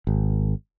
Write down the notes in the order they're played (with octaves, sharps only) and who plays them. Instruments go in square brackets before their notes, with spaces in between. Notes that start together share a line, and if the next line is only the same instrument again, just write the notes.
[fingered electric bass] G#1